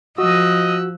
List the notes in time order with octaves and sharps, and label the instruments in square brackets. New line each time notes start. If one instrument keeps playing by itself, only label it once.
[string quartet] F3 [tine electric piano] F#4 [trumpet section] D#5 [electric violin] E6 F#6